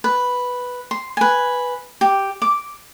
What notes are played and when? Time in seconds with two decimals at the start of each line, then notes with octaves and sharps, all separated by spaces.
0.04 B4
0.91 C6
1.17 B4 G#5
2.01 G4
2.42 D6